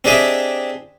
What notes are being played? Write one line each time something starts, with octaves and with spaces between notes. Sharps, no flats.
C4 D4 G4 G#4 D#5 E5